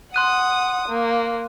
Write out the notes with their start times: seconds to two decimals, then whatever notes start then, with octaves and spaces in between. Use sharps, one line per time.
0.14 F#5 C6 D#6 F#6 D#7
0.88 A#3